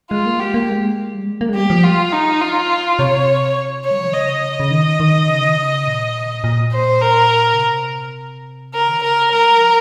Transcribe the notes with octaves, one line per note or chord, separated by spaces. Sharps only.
G#3 F4
A#3
G#3 G4
A#3
G#3
G3
G#3
A#3
G#3
G3 G4
F3
F4
D#4
F4
C3 C#5
C#5
G3
F3
D#3
C#3 D#5
C#3
D#3
D#3
C#3
D#3
C#3
A#2
A#2
C5
A#4
C#3
C3
C#3 A#4
D#3
C#3
A#4
G#3 A#4
G3
F3